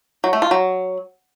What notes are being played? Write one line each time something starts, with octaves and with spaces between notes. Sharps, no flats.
F#3
A3
F4
F#3